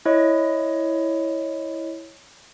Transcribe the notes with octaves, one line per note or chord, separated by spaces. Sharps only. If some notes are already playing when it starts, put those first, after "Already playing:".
E4 C#5 D#5